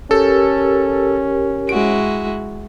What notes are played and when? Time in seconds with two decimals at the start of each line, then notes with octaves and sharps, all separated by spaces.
0.11 C#4 G4 A4 A#4
1.69 G#3 E4 F#4 D7